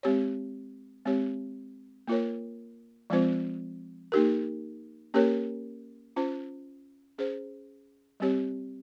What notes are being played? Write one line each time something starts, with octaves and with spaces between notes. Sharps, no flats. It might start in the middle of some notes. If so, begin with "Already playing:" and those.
G#3 C4 G4 C#5
G#3 C4 G4 C#5
A#3 F4 A#4 C#5
F3 G#3 C4 F4 C5
A#3 D#4 G4 A#4
A#3 C#4 G4 A#4 C#5
C#4 F4 C5
C#4 G#4 C5
G3 C4 G4 C#5